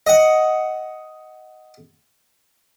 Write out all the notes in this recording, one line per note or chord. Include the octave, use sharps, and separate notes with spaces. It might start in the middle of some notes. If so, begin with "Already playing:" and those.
D#5 F#5